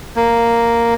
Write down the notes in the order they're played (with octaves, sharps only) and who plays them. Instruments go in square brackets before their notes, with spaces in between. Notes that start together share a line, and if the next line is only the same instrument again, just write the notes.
[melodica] A#3